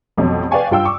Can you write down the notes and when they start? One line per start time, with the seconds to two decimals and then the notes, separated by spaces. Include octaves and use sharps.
0.17 A1 F2 B2 F#3
0.51 B4 D5 F5 G5 G#5 C#6
0.71 G2 F4 G5 E6
0.85 C#6 D6